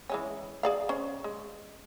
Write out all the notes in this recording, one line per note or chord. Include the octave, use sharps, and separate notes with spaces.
E3 G#3 C#4
G#4 D5 F5
C#4 C5
G#3